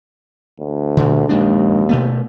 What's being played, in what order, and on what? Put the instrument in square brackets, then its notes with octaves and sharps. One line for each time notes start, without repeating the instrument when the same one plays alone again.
[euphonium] D2
[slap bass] A#2 D3
[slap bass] A#1 G#3 D4 [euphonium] D#2
[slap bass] B2 A3 B3